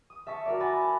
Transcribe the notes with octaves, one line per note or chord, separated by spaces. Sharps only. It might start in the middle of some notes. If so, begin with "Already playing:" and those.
D#6
E5 A5 C#6 B6
F#4 A#4 D5
F#5 G#5 B5 A6 A#6
A5 F#6